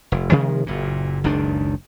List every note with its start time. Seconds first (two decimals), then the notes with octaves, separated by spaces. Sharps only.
0.12 F1
0.30 C3 D#3 F3 G#3
0.67 F#1 A#2
1.24 F#1 C#2 D#3 D4